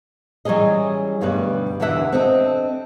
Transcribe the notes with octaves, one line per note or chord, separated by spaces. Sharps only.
E3 F#3 G3 C#4 G#4 D#5
D2 G2 B2 G3 B4
E2 D3 E3 D4 E5 F#5
C4 D4 A4 D#5